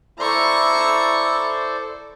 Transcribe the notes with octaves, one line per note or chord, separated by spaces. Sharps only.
E4 A4 C5 D5 A#5 C#6